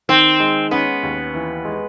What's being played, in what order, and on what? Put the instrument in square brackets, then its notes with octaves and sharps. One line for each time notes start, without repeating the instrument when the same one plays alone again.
[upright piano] D#3 [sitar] C4
[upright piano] G#3
[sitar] B3 [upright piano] C#4
[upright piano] D#2
E3
G#3